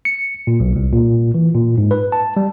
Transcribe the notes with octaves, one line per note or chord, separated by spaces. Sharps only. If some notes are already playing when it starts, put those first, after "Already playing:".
C#7
A#2
B1
C2
A#2
E3
A#2
G#2
B4
A5
G3